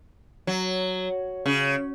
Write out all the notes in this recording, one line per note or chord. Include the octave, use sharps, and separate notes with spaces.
F#3
C#3